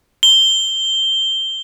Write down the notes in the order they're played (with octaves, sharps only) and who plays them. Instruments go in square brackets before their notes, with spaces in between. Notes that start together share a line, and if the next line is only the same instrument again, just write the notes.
[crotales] G7